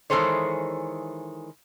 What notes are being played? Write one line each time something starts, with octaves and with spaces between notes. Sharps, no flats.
D#3 E3 G#3 A4 C5 C#5